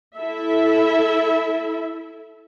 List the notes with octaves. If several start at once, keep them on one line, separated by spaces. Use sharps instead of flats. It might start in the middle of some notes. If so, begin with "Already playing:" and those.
E4 A4 E5